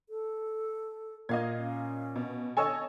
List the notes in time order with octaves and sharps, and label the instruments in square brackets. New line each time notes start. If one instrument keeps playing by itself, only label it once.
[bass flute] A4
[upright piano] A#2 [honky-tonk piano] D#5 F5 G#6
[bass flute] C#4
[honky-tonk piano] B2
[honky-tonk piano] A4 C#5 D#5 [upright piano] G#5 C#6 E6